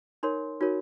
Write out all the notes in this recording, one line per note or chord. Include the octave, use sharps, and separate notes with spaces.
D#4 A#4 C#5 C6
D#4 F#4 A#4 C#5